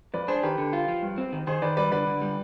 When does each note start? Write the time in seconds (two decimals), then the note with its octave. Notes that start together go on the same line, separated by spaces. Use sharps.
0.14 F2 B4 D5
0.28 D4 G#4 C5
0.43 D#3 G4 B4
0.58 D3
0.73 F4
0.88 F3
1.03 G2
1.18 C4
1.32 D#3
1.47 D#3 G#4 C5
1.62 D#3 B4 D5
1.77 G3 B4 D5
1.91 D3 B4 D5
2.07 D3
2.21 G3